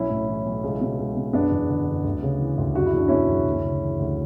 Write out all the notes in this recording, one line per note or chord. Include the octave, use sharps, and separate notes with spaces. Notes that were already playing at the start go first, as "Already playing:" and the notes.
Already playing: B1 C#4 E4
A2
E3
B1
C#2
B2
C#2
B2
F#1 B3 D4
E2
D3
F#1
D2
C#3
E3
D2
F#1 F#4
E4
E2 D4
B2 C#4 E4
F#1
D2
C#3
E3
D2